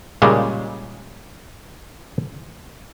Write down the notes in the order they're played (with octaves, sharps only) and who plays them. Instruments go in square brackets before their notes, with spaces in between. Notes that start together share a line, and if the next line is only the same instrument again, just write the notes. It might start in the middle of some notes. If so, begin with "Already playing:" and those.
[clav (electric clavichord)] A#2 C#3 G3 G#3